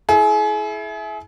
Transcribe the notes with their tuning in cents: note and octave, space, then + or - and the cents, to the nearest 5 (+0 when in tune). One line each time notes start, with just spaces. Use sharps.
E4 +0 G#4 +35